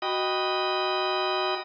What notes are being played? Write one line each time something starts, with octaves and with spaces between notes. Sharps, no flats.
F#4 D#5 G5 B5 D#6